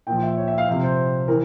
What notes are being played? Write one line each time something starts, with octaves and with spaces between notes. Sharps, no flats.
A#2 F3 G5
E5
C#5
E5
F5
C3 F3 E5
C5
E3 A#4